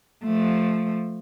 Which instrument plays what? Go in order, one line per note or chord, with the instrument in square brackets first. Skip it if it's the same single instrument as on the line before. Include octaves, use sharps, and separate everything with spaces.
[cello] F3 A3